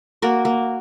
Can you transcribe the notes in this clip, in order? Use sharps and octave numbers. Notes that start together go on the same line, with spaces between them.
A#3 F#4 A#4
A#3